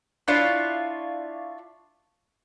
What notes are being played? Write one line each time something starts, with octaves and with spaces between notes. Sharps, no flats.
D4 E4 F4 C#5